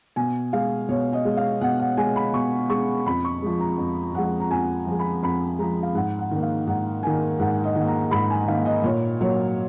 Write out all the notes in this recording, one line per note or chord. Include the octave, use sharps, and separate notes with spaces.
B2 G#5
G#3 F5
B2 C#5
D#5
G#3
F5
B2 F#5
F#5
G#3 G#5
B5
B2 C#6
G#3 C#6
F2 B5
C#6
F3 G#3
A#5
F2
F3 G#3 F#5
A#5
F2 G#5
F3 G#3
B5
F2 B5
F3 G#3 A#5
F5
G#2 F#5
F#5
D#3 A#3
F5
G#2 F#5
D#3 A#3 G#5
G#2 F#5
D#5
D#3 A#3
A#5
G#2 B5
G#5
D#3 A#3 F5
D#5
A#2 C#5
F#3 A#3 C#5